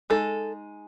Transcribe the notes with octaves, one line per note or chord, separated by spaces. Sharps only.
G#3 D#4 A4